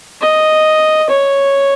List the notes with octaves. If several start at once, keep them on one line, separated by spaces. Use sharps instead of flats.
D#5
C#5